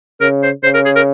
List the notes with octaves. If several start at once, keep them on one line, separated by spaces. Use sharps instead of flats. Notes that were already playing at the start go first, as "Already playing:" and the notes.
C#3 A#4
C5
C#3 C5
A#4
G#4
A#4